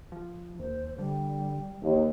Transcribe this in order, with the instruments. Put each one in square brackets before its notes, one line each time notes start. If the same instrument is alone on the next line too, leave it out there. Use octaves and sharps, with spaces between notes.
[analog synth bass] F3
[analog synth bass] D#2 [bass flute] C5
[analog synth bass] D3 [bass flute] G3
[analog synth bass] A#1 [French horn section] D#2